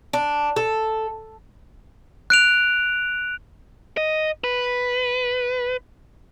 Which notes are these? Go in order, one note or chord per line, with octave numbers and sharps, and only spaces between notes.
D4
A4
F#6 D7 F7
D#5
B4